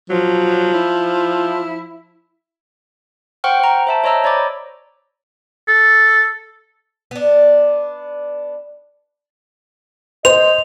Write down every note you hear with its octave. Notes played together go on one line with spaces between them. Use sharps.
F3 F#3
E4
C5 F#5 G5 C#6 F6
C5 A#5
C5 E5 A5
C5 C#5 D#5 A#5 E6
C#5 D5 B5 D6
A4
B3 D4
C5 D#5 F7